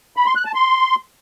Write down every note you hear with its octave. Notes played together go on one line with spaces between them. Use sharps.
B5
C6
F#6
A5
C6